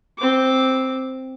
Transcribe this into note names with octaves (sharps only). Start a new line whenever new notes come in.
C4 D6